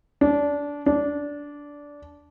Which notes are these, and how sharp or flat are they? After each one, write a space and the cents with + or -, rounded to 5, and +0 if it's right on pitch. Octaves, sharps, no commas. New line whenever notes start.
D4 -20
D4 -15